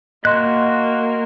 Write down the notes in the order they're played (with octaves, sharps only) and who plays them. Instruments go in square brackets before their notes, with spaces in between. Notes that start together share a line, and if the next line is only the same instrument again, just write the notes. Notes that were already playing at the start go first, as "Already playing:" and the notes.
[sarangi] A#3 [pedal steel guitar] F#4 F#6 [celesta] D#5 C6